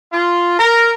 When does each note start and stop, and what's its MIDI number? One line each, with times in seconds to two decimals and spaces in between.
0.12 0.58 65
0.58 0.93 70